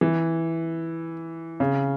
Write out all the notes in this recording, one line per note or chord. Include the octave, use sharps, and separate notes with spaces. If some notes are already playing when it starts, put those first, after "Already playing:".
E3
C#3